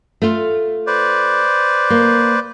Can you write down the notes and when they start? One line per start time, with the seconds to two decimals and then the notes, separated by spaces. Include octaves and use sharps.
0.22 A3 F4
0.87 B4 C5 D5
1.90 A#3